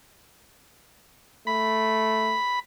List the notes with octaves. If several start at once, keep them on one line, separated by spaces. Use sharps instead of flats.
A3 B5